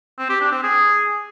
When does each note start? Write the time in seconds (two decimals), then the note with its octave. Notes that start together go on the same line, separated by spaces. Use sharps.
0.18 C4
0.29 G4
0.41 D4
0.52 C4
0.63 G#4